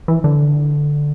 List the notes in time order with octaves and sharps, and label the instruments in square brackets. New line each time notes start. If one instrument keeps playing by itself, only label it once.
[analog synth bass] E3
D3